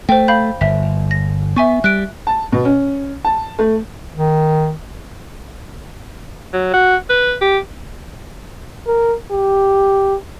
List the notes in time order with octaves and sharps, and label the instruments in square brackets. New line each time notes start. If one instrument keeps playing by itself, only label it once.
[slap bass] A3 [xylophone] C5 G5
[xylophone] F5 B5 G6
[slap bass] G1 [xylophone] E5 B6
[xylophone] A#6
[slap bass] B3 [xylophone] E5 G#5 C#6
[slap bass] G3 [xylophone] F#6 D7
[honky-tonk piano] A5
B2
C#4
A5
A3
[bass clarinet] D#3
[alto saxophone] F#3
F#4
B4
G4
[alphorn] A#4
G4